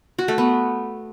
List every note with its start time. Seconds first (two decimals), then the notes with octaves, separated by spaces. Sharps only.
0.19 F#4
0.28 A3
0.38 B3